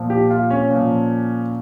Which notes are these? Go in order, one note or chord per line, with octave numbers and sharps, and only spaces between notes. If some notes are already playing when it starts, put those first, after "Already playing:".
Already playing: A#2 F3
G4
F4
C#4
A#2 F3